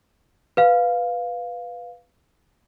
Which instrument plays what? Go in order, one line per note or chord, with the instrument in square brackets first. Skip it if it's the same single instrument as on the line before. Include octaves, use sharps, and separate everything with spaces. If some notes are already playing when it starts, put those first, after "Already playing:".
[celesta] B4 F5